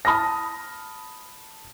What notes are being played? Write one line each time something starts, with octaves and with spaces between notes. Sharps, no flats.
A5 B5 D#6 F6 A#6